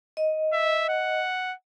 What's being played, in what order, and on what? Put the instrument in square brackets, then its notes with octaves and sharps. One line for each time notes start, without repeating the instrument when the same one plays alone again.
[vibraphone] D#5
[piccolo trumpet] E5
F#5